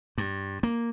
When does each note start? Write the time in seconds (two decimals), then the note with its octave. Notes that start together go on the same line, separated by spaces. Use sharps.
0.18 G2
0.63 A#3